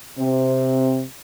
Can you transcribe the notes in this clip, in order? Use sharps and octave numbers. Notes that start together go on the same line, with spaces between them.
C3 C4